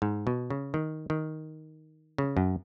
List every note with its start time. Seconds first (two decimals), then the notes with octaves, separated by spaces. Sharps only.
0.02 G#2
0.27 B2
0.50 C#3
0.74 D#3
1.10 D#3
2.18 C#3
2.37 F#2